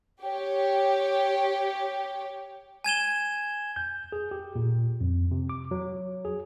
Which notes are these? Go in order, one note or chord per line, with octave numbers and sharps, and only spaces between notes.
G4 C#5
G#5 G#6 E7 G7
G6
G#4
G4
A#2
F2
C3
D6
F#3
G#4